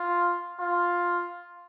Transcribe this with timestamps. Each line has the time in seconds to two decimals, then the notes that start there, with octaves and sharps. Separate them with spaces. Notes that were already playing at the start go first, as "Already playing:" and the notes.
Already playing: F4
0.59 F4